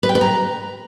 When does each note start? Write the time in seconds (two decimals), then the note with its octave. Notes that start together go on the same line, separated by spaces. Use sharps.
0.03 B4
0.09 G5
0.15 B4
0.21 A#5